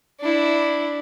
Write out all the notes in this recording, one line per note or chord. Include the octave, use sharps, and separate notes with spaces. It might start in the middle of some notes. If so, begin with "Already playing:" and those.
D4 E4